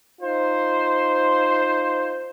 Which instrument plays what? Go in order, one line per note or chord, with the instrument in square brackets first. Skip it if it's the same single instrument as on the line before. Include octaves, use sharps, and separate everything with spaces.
[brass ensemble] D#4 F4 C5